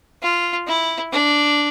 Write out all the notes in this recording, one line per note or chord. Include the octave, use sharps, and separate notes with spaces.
F4
E4
D4